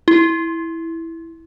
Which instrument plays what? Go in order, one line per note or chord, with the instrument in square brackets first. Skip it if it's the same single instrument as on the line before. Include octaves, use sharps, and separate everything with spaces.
[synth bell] E4